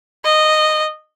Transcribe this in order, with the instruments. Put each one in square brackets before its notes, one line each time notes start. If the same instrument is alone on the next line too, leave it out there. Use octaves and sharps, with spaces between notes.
[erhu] D#5